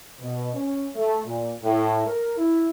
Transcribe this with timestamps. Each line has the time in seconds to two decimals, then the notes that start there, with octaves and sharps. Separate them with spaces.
0.20 B2
0.54 C#4
0.95 A3
1.25 A#2
1.63 A2
2.06 A#4
2.37 E4